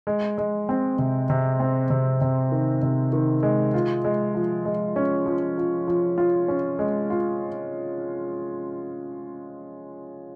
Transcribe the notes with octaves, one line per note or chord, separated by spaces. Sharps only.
G#3
G#3
C4
C3
C3
C4
C3
C3
D#3
C3
D#3
G#3
F4
G#3
F3
G#3
C#4
F3
F3
F3
F4
C#4
G#3
F4